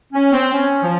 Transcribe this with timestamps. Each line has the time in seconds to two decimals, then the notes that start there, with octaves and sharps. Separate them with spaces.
0.13 C#4
0.33 C4
0.53 C#4
0.82 F3